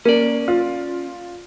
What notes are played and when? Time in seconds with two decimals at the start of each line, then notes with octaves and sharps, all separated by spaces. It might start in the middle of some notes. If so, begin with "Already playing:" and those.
0.05 A#3 C#4 D5
0.48 F4